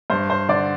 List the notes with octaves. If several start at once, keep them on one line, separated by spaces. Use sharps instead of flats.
G2 C5
C5
D3 D5